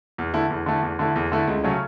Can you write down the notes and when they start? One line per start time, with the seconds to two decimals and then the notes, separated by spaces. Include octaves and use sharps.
0.18 E2
0.34 D3 A3 E4
0.50 E2
0.66 D3 A3 E4
0.83 E2
0.99 D3 A3 E4
1.16 E2
1.32 D3 A3 E4
1.47 C#2
1.64 C#3 F#3 A3 C#4